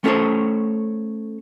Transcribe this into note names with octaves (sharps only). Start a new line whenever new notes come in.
A3 C#4 A4 C5 C#5